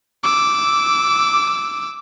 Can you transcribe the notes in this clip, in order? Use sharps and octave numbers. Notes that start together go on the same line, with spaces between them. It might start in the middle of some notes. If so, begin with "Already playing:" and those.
D6 E6